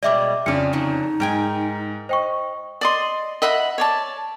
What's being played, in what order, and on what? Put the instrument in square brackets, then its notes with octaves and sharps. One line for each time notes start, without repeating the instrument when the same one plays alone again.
[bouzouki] B2 G3 G#3 [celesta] D5 E5 D6
[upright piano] F2 C#3 [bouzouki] F4 D5 [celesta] C#7
[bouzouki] D3 E3 F#3 [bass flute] D#4
[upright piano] G#2 [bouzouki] A#4 G5 G#5
[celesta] C5 G5 C#6 [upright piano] D#5
[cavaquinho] D5 D#5 C6
D#5 E5 F#5 B5
C#5 D5 A5